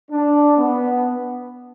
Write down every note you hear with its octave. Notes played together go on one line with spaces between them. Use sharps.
D4
B3